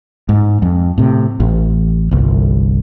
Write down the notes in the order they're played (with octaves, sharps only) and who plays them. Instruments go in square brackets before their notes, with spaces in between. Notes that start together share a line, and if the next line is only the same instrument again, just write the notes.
[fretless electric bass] G#2
F2
A2 C3
A1
G1 C2